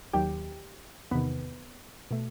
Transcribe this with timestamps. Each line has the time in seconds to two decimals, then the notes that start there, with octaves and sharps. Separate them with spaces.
0.13 D#2 D#3 F#3 G4 G5
1.11 E2 C3 D#3 B3 B4
2.11 B2 A3